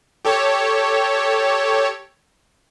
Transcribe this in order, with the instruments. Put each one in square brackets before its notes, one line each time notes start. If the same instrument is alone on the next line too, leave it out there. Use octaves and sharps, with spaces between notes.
[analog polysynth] G4 A4 C#5